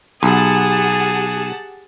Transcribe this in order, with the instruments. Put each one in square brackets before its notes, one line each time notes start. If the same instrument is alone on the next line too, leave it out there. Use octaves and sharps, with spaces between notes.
[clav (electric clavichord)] B1 [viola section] G4 F#5 A5 [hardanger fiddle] G#4